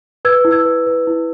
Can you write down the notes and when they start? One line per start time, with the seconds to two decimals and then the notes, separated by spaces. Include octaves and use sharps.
0.25 B4 E6 G#6
0.45 E4
0.51 E6 G#6
0.65 B4
0.87 B4
1.07 E4